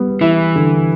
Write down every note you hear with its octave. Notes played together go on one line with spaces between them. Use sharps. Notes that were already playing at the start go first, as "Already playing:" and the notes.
Already playing: G3 B3
E3 E4
D3